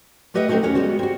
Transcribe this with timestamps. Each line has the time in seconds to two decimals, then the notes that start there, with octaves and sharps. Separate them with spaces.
0.34 A3 G4 B4 D#5 E5 F#5
0.48 A3 C4 D4 D#4 F#4 G#4
0.63 D#2 C#4 C#5 F#5
0.75 G3 G#3 B3 F#4
0.99 C4 F#4